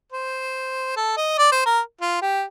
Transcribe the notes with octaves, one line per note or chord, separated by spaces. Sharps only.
C5
A4
D#5
D5
C5
A#4
F4
G4